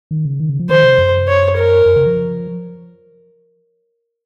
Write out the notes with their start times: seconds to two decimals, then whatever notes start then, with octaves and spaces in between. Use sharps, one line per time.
0.11 D#3
0.25 C#3
0.40 D#3
0.50 C#3
0.60 F3
0.69 D#3 C5
0.84 C3
0.98 F#2
1.28 C#5
1.56 A#4
1.86 F#2
1.96 C#3
2.06 F3